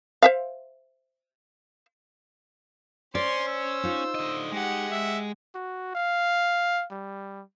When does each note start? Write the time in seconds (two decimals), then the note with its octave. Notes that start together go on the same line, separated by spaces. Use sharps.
0.22 C5 E5 F5
3.15 C#4 C5 D5 C6
3.48 E6
3.84 D#4 F4
4.15 D3 D#5
4.52 G#3 G4 F#5
4.92 E5
5.55 F#4
5.95 F5
6.91 G3